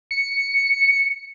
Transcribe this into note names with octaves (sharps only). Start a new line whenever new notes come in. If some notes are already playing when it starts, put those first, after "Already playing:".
C#7